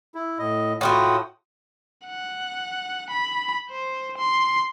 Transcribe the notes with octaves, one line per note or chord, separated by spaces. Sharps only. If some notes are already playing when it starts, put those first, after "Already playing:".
E4
A2 D#5
A2 F4 F#4 F#5 G5 D#6
F#5
B5
C5
C6